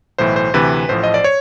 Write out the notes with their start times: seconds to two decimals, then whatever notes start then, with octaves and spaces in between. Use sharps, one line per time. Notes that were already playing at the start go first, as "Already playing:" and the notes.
0.18 B1 A2 E3 C5
0.36 C5
0.54 D2 C3 E3 B4
0.89 A1 A2 F3 C5
1.04 D#5
1.14 D5
1.24 C#5